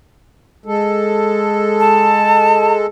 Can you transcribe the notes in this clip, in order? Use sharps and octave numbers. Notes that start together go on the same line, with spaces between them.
G#3 A4
A5